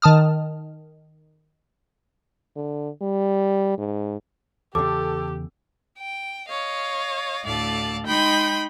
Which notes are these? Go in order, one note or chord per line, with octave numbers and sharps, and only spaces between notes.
D#3 A5 D#6 F6
D3
G3
G#2
E2 C#3 G4 A4 D6
G5
C#5 D#5 F5
D2 A2 D5 F5 A5
G#3 D#4 G5 B5 C6